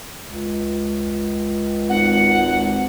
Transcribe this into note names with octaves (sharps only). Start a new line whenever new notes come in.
C#2
G#1 F#5